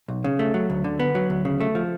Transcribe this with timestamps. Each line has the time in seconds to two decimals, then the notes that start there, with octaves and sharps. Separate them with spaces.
0.08 B1
0.24 C#3
0.39 A3
0.54 F#3
0.70 D2
0.84 D3
0.99 B3
1.15 F#3
1.30 D2
1.45 C#3
1.61 A3
1.75 F3